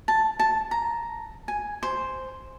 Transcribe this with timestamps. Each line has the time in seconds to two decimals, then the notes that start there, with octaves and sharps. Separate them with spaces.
0.08 A5
0.39 A5
0.71 A#5
1.48 G#5
1.83 C5